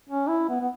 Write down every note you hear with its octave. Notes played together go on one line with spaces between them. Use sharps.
C#4
E4
B3
B3